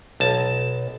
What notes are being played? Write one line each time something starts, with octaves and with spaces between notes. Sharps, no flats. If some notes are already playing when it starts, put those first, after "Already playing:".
B1 A5